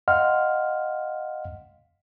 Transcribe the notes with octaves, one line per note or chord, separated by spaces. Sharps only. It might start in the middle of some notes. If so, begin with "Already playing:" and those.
D#5 F5 F#5 C6 F6